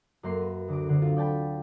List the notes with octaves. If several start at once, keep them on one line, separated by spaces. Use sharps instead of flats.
F#2 A#3 C6
B4
D2 D6
D3 C4
F4
D5 G5 A5 B5